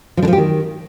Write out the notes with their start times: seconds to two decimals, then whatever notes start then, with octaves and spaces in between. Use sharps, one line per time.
0.17 F3
0.22 D3
0.28 F3
0.33 G4
0.38 D#3